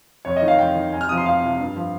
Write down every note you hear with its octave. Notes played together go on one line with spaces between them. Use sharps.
F2 C#5
D#5
D#3
F5
F2 G5
D#3
F2 G#5
F6
C3 F3 D#6
C6
F2 F5
C3 F3
G2
F3